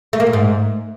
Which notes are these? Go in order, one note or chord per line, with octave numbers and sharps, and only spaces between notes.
A3
A#3
A#2
G#2